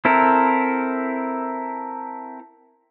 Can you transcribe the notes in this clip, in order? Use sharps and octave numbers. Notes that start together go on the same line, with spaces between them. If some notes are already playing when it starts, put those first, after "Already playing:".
C4 E4 A4 A#4